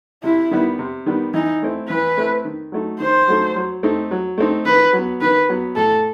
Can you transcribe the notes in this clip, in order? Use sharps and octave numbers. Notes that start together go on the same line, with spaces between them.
C3 E4
D#3 G3 B3
C3
D#3 G3 B3
E3 D#4
A3 C4 E4
E3 B4
A3 C4 E4
D#3
F#3 A3 D#4
D#3 C5
F#3 A3 D#4
F#3
A3 C4 D#4
F#3
A3 C4 D#4
D#3 B4
F#3
B3
D#3 B4
F#3 B3
A2 A4